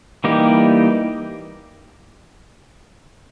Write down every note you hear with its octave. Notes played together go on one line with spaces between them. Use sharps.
E3 G3 A#3 D#4 G4